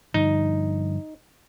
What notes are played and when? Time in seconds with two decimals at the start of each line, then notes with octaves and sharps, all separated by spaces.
0.14 G2 D3 F3 D#4